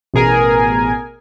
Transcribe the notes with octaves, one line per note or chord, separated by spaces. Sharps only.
A1 B2 G#4 A#4 G#5